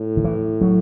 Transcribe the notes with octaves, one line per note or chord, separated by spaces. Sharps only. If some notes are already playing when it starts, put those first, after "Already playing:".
Already playing: A2
D#3
E3
F#3